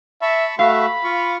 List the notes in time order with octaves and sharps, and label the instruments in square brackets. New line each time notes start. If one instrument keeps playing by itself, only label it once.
[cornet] E5 [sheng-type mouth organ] A5 B5 C#6
[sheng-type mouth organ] A3 F#4 E5 [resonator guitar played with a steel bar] F5 [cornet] B5
[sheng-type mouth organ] F4 C#6